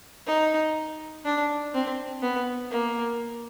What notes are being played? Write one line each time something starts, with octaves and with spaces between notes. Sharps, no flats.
D#4
D4
C4
B3
A#3